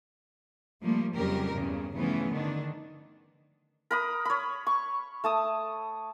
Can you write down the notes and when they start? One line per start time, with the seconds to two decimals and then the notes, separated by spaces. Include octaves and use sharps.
0.84 F3 G3 A3 A#3
1.16 F2 C#3 F#3 G3 G4 A#4
1.55 E2 G2 C#3
1.96 C#3 E3 F3 A3 B3 C#4
2.32 D3 D#3 D4
3.91 A#4 B5 D#6
4.25 C#5 B5
4.67 C#6
5.24 A3 A5 D#6